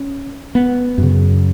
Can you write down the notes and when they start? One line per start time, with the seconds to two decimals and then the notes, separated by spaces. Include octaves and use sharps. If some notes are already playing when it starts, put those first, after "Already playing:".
Already playing: C#4
0.55 B3
0.98 F#2 C#3